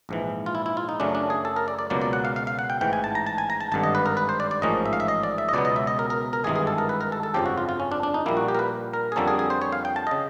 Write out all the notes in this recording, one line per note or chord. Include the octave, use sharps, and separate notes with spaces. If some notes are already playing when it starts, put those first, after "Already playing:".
A#1 G#2 E3
F4
E4
E4
F4
D#4
F#2 C#3 F#3 A3 C#4 D4
D4
G#4
A4
A#4
D5
D5
C#2 B2 F#3 A#3 D5
D5
F#5
F5
F5
F5
F#5
G5
A1 G#2 E3 G5
G#5
A5
A#5
A5
G#5
A#5
A5
G#1 G2 D3 A5
D#5
B4
A#4
B4
C5
D5
D5
A1 G#2 F3 A#3 C#4 D#5
E5
F5
E5
D#5
D5
E5
D#5
C#2 B2 F#3 B3 D5
D#5
E5
D#5
A#4
A#4
A#4
G#1 G2 E3 G#3 G#4
G#4
A4
A#4
B4
A#4
A4
A4
G1 F2 C#3 F3 G4
F#4
F4
F4
C#4
D4
D4
D#4
A#1 A#2 G3 A#3 E4
F#4
G4
A#4
B4
A#4
G#4
F2 D3 G3 A#3 C#4 A4
G#4
G#4
C5
C#5
F5
G5
A5
C#3 D#5